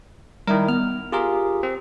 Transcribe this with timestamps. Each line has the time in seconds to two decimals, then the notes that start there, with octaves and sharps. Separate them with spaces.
0.47 D#3 G3 E4 A#4
0.68 B3 F6
1.12 F4 G4 G#4 A#4
1.63 C4